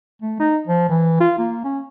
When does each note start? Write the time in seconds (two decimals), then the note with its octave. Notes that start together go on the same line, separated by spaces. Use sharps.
0.22 A3
0.40 D#4
0.67 F3
0.89 E3
1.20 F4
1.38 A#3
1.64 C#4